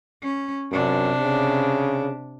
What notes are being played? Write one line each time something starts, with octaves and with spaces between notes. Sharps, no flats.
C#4
F#2 C3 D4
C#3